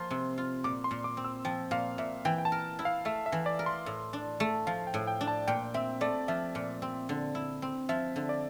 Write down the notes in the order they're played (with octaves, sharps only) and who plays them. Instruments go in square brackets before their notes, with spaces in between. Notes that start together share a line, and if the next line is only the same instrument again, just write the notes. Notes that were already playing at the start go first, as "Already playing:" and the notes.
Already playing: [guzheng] F3 A#3 [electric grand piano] C6
[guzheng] C3
F4
[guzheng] A#2 [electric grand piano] D6
[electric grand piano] C6
[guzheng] A#2
[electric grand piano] D6
[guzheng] C4
[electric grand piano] E6
[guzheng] F3 [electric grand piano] G5
[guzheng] A#2 [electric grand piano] F5
[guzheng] A#2 [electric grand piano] E5
[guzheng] E3 [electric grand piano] G5
[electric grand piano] G5
A5
[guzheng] A#4
E4
[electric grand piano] F5
[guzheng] A3 [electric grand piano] E5
[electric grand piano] E5
[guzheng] E3
[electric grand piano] D5
[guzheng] A#4
[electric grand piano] C6
[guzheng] A2
D4
A3
[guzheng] F3 [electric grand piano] F5
[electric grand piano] G5
[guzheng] A2
[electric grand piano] G5
[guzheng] D4
[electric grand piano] A5
[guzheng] A#2 [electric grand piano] G5
[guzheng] C4 [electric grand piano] E5
[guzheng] A3 [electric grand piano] D5
[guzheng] F3 [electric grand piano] E5
[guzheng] A#2
C4
D3
E4
C4
[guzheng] F3 [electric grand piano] E5
[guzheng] D3
[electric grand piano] D5